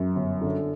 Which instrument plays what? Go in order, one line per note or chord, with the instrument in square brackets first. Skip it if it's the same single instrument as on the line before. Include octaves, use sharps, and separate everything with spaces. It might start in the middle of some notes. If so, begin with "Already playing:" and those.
Already playing: [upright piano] F#2
G1
D3